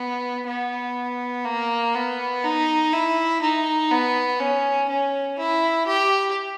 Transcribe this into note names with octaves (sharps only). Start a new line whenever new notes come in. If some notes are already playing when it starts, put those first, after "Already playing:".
Already playing: B3
B3
A#3
B3
D#4
E4
D#4
B3
C#4
C#4
E4
G4